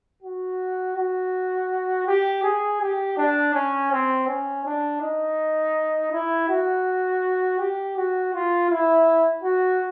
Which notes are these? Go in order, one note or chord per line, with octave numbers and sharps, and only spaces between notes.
F#4
F#4
G4
G#4
G4
D4
C#4
C4
C#4
D4
D#4
E4
F#4
G4
F#4
F4
E4
F#4